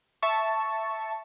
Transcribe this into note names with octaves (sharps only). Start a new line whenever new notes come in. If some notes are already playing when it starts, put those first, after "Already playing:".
E5 A5 C#6